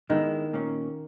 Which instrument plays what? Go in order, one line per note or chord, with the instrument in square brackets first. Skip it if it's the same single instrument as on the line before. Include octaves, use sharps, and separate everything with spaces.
[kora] D#3 [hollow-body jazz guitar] G#3 B3 E4
[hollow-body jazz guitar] A#2 A#3 C#4